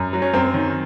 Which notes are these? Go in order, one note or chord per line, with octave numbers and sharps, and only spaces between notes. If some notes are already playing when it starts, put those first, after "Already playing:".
Already playing: F#2
F#3
C#4
F#2 C4
D#3